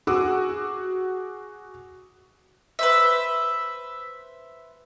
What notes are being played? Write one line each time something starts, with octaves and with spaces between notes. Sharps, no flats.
F#4 G#4 F#5 D6 E6
B4 C5 E5